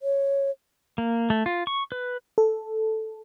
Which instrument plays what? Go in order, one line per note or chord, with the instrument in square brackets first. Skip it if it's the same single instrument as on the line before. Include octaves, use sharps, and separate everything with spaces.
[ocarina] C#5
[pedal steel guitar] A#3
A3
F4
C#6
B4
[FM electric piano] A4